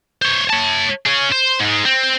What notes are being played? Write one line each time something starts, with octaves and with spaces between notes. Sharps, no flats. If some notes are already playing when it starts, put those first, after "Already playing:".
C5 C#5
C#5 A5
C#4 G#4
C5
G#2 G#3
C4